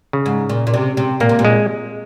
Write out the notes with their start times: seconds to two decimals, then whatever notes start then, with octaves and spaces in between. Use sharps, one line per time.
0.13 C#3
0.26 G#2
0.49 A#2
0.67 A#2
0.74 C3
0.97 C3
1.20 A#2 A#3
1.29 C3
1.39 A#2
1.45 G#3